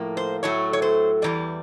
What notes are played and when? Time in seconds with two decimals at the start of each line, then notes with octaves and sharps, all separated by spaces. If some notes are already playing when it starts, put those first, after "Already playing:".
Already playing: A2 F3 A#3
0.17 C5
0.43 A2 F#3 A3 C#5
0.73 C#5
0.82 C5
1.22 E2 C3 E3 G3 D5